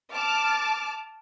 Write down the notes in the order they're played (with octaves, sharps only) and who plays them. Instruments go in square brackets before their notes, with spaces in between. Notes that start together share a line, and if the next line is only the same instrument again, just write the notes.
[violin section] A5 D6 F6